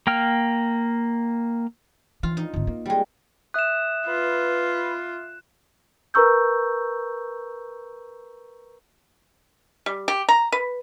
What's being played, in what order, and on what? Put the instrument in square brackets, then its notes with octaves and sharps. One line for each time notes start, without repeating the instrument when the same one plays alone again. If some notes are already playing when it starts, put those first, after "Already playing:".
[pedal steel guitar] A#3 G5 F6
[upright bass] E3 [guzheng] F4
[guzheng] D#4
[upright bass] G#1 D3
A#3
[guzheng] G3 G#3
[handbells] E5 D#6 [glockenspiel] F#6 E7
[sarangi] F4 [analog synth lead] B4
[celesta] A#4 B4 A#5 C#6 E6 G6
[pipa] G3
G4
A#5
B4